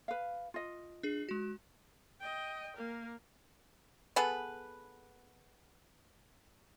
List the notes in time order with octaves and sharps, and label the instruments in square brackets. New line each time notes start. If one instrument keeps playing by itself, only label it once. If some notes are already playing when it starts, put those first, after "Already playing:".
[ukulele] B4 F5
F4 D#5
[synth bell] D4 G#4
G#3 F#4
[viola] D#5 G5
A#3 A#4
[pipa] B3 G#4 A4 B4